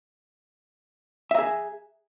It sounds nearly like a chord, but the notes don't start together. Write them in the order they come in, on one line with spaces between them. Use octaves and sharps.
E5 A#5 G#4